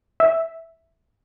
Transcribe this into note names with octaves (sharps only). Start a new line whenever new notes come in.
E5